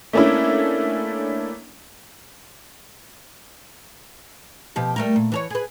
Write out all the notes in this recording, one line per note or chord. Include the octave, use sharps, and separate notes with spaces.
A3 A#3 C#4 D4 E4
B2 F3 G4
G3 A3 A#4
A#2
E3 A4 C#5
G#4 B4